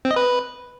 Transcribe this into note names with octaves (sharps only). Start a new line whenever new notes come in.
C4
D#5
B4